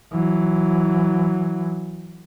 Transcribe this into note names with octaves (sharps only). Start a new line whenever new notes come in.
E3 F#3